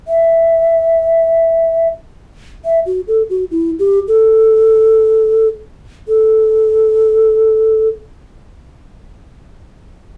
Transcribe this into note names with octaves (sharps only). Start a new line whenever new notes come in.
E5
E5
F#4
A4
F#4
E4
G4
A4
A4